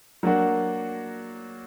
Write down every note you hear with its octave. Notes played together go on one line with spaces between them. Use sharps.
F#3 A#3 D4 F#4